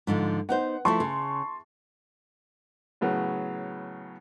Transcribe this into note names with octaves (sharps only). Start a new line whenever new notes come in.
G#2 D3 F3
B3 D#4 C5 F#5
F3 A3 E4 A5 C6 C#6
C#3
A2 C#3 F#3 B3